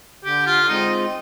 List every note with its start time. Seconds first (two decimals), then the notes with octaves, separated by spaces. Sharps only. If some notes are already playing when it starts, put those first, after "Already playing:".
0.24 D3 G4
0.46 F4
0.69 G#3 C4 D#4 F4